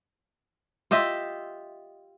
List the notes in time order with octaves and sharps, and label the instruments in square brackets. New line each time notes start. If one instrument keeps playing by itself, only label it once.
[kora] F4 G4 D#5 E5